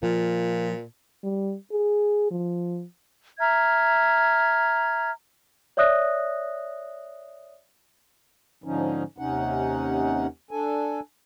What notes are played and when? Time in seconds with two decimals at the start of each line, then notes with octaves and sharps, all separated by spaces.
0.03 A#2 F3
1.24 G3
1.72 G#4
2.31 F3
3.39 E5 A#5 F6 G#6
5.77 C#5 D5 E5 D#6 F#6 A#6
8.64 G#2 D3 F3 C#4 D#4
9.18 D#2 C3 C#4 D#4 F#5
10.51 D4 A4 G#5